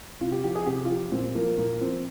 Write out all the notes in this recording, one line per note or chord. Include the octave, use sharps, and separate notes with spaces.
C3 F4
G4
F3 G4
G#4
C3 G4
F4
F3 G4
A#2 C4
F3 A#3
A#2 A#3
F3 C4